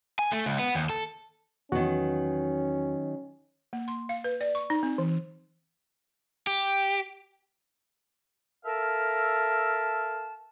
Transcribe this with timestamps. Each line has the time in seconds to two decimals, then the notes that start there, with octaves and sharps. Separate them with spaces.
0.19 G#5
0.32 A3
0.46 C#2
0.59 B3
0.75 D#2
0.90 A4
1.72 E2 D#3 F#3 B3 C#4 F#4
3.73 A#3
3.88 C6
4.09 F5
4.24 B4
4.41 D5
4.55 C#6
4.70 D#4
4.83 C4
4.98 E3
6.47 G4
8.65 A4 A#4 E5 F5 A5